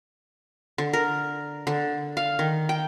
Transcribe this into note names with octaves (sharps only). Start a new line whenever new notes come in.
D3
A#4
D3
F5
D#3
G5